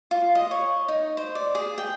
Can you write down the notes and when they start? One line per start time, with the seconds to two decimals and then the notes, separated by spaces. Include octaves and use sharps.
0.11 F4
0.35 D#5
0.51 C#5
0.88 D#4
1.17 C5
1.35 D5
1.55 G#4
1.78 G5